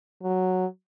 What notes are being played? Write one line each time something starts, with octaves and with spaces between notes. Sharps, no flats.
F#3